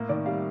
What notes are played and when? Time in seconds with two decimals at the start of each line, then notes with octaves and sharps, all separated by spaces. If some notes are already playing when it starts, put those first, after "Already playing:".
Already playing: A2 A#3
0.09 D#3 D5
0.26 G3 F5